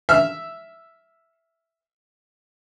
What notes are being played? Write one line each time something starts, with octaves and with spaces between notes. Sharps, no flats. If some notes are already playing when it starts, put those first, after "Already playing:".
E5 F6